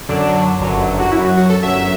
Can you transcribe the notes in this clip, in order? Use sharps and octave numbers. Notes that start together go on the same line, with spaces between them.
F#2 D3 F#3 D4
G1 F#2 D3 F#3
F#4
F#2 F#3 E4
F#4
F#4
A4
G1 F#2 F#3 E5